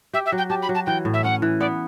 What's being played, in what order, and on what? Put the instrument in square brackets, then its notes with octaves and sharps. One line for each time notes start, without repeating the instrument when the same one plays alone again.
[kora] G4 [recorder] E5
[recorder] E5
[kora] F#3
[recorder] G5
[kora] G4 [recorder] A5
[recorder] B5
[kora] F#3
[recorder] A5
[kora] E3 [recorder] G5
[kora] A2
[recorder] E5
[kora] C#4 [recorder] F#5
[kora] E3
[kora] B3 [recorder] D5